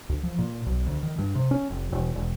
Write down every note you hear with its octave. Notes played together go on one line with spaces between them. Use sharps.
D2
F3
A#2
B1
D2
D#3
G2
C3
C#4
F1
E1
E1